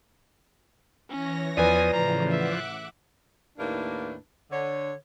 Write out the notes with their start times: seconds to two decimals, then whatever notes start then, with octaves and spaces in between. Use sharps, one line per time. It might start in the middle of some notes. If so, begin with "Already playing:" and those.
1.09 E3 C#4 C#5 A#6
1.57 E2 F3 B4 D5 G#5 D#6
1.93 A2 C#3 E3 F3 A#5
2.31 E5 F#5 D6 F#6
3.59 D#2 A2 A#3 D4 E4 B4
4.51 D3 C#5